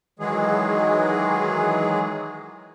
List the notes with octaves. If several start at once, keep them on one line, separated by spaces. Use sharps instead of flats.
D#3 E3 F#3 G#3 G#4